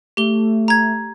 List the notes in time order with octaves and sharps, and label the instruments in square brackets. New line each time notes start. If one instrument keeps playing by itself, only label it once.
[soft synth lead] A3 [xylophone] G4 G7
[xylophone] A#5 G#6